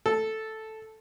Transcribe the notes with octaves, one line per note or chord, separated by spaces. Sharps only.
A4